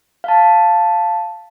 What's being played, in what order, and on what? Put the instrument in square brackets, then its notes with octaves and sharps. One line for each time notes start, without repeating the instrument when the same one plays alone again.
[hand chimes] F5 A5